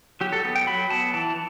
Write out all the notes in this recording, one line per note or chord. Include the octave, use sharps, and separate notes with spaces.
F#3 G4
A4
B3
G5
F#3 B5
B3 A5
E3 A5